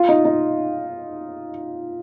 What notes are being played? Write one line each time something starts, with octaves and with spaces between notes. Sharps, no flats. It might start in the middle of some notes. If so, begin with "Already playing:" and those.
Already playing: F4
D#4
D#4